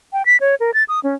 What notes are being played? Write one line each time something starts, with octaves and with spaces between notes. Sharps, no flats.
G5
B6
C#5
A#4
A6
D#6
C#4